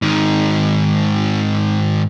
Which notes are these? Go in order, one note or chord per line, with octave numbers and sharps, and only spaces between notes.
G#2 D#3